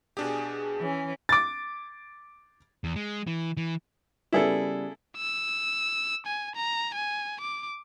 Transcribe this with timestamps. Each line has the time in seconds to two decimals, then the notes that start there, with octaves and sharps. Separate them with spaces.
0.17 B2 D4 G4 G#4
0.80 E3 C#4
1.29 D6 A6
2.84 E2
2.96 G#3
3.27 E3
3.57 E3
4.33 C#3 G3 B3 E4 G#4 A4
5.17 E6
6.27 G#5
6.56 A#5
6.95 G#5
7.40 D6